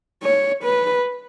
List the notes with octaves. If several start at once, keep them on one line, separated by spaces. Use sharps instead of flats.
C#5
B4